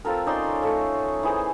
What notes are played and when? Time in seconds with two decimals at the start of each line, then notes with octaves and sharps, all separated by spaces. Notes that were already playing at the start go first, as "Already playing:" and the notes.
0.05 C4 F4 A4 A#4
0.26 C#4 D#4 D5 C6
0.62 A3 A4 C#5 F5
1.23 E3 G#4 C5